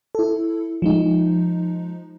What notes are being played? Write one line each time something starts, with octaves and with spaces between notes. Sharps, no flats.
E4 A4
F3 G#3 D#4